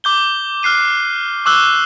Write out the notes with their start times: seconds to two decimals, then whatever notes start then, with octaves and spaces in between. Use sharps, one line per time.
0.04 D6 G6 G7
0.63 F6 F#6 C7 D#7
1.45 C#6 D6 E6 F#6 G7